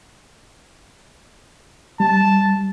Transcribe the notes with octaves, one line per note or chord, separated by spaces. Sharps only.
G3 A5